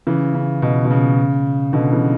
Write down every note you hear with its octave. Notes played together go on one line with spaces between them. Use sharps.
C#3 E3
C#3
B2
B2
C#3
B2 D3
C#3 E3